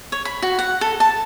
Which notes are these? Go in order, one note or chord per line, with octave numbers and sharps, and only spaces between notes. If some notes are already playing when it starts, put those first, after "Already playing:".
C#5
B5
F#4
F#5
A4
A5